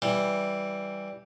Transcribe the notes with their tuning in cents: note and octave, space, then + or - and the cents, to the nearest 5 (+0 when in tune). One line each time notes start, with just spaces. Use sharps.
E3 +0 G3 +0